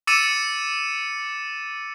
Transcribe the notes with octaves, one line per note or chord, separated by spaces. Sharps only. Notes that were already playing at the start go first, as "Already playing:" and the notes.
D6 E6 A6 C#7 D#7 E7